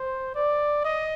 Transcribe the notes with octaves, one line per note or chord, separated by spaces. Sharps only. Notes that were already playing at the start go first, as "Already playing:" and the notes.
Already playing: C5
D5
D#5